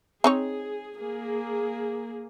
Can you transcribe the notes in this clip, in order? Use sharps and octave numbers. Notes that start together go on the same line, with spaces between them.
C4 D#4 G#4 C#5
A#3 G#4